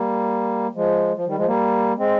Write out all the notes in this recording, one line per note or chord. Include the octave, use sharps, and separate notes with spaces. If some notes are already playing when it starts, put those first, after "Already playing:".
Already playing: G3 A#3
F3 G#3
F3
D#3 G3
F3 G#3
G3 A#3
G#3 C4